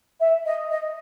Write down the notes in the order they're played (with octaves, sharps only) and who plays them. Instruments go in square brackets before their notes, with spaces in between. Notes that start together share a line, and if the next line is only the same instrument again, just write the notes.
[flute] E5
D#5
D#5